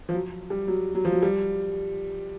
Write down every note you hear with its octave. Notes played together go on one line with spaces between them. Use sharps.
F3
F#3
G3
F#3
F#3
F3
F#3
G3